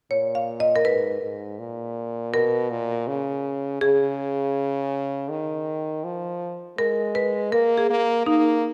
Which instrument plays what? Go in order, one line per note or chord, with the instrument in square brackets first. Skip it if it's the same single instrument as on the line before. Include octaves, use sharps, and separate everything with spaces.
[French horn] A#2 [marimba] C#5
[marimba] F5
D#5
A#4
[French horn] G#2 [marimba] B4
[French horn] G#2
A#2
[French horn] B2 [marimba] A#4
[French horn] A#2
C#3
[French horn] C#3 [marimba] G#4
[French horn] D#3
F3
[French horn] G#3 [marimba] A#4
[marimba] B4
[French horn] A#3 [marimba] A#4
[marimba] G#4
[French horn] A#3
[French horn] A#3 [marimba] D#4